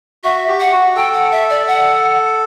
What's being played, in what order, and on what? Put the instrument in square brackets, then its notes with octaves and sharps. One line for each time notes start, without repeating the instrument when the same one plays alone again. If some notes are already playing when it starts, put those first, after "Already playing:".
[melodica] F#4 [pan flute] E5
[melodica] G4
[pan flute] F#5
[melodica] G4
F#4
[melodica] A4 [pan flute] G5
[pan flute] F#5
E5
D5
F#5